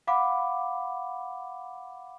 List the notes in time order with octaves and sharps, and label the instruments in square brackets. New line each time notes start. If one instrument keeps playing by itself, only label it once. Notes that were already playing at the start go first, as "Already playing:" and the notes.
[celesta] F5 F#5 B5 D6